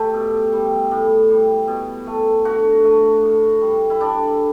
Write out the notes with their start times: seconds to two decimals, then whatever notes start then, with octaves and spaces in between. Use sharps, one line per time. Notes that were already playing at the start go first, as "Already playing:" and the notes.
Already playing: A3 G4 A4
0.14 B2
0.53 G3
0.91 A2
1.29 G3
1.67 B2
2.07 A3
2.45 D3 F#4
2.84 A3
3.22 A2
3.62 G3
3.90 E4
4.01 D3 D4